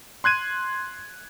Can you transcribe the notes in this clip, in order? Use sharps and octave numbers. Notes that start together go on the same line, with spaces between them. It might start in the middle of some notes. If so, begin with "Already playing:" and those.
C6 F#6 G#6 D#7